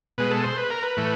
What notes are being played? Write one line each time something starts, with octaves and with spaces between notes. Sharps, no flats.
B2 G#3 B4
A4
C5
B4
A#4
B4
A2 E3 A3